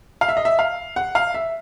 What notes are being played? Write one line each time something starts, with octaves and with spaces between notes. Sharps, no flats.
F5
E5
D#5
E5
F5
F#5
F5
E5